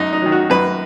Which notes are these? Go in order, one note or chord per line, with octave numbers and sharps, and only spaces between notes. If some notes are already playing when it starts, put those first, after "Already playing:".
Already playing: F#2 D#4
D#4
D#3 F#3
F#4
F#2 B4